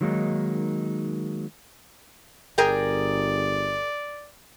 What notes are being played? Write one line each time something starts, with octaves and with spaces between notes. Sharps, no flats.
D#3 F#3 G#3 A#3 D#4
G1 G#4 A#4 D5 G5